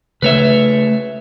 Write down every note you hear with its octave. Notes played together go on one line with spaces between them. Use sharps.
C#3 A3 B4 C#5 E5